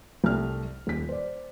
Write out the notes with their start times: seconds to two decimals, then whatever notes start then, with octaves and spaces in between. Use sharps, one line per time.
0.24 C2 A3 F6
0.87 D#1 B6
1.09 C5 D5